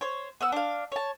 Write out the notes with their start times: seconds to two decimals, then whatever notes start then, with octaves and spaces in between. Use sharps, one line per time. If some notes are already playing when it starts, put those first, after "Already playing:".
0.01 C5 C#5
0.41 B3 F#5 E6
0.52 D4 F5
0.92 C#5 A5